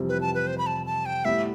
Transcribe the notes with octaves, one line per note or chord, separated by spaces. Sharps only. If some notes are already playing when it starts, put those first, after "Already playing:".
Already playing: F2 C3 E3 G3 C4
B4
A5
B4
C5
B5
A5
A5
G5
A2 G3 B3 E4 E5